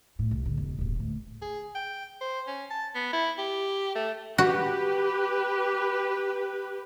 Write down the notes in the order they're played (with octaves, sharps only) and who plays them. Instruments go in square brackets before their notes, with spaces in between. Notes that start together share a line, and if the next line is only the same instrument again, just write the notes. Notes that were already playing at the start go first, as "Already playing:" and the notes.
[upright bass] A2
C2
A2 D3
E1
D#1 G#1
D2 A2
[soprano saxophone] G#4
G5
C5
C#4
A5
B3
E4
G4
A3
[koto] F#4 [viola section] G4 B4